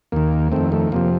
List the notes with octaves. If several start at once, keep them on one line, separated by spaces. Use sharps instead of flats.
D#2 D#3 A#3
F2 D#3 A3 C4
A3
F2 C3 F3 A#3